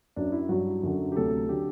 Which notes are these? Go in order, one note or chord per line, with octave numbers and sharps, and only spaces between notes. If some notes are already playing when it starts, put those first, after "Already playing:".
F#2 F#3 D4
E4
G2 F#3 F#4
F#2 D3 F#3
G4
D2 C3 F#3 A4
D3 F#3 G4